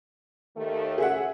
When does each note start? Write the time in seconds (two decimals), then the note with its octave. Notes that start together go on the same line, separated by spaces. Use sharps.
0.56 D#2 D#3 A3
0.98 G#4 E5 F#5